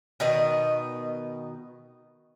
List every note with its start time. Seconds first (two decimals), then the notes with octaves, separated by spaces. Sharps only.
0.20 B2 D#3 D#5